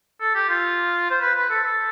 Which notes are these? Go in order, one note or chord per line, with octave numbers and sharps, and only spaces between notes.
A4
G4
F4
C5
B4
B4
A4
A4